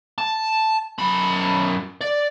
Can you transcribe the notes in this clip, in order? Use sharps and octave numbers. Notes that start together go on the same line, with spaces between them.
A5
F#2 B5
D5